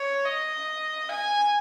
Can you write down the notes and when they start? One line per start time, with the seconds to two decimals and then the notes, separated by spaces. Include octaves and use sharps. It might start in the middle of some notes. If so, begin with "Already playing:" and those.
Already playing: C#5
0.25 D#5
1.09 G#5